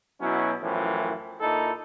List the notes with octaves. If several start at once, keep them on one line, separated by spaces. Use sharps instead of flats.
B2 F#3 C#4 E4
F#2 A2 E3 F3
A#2 D#4 E4 A4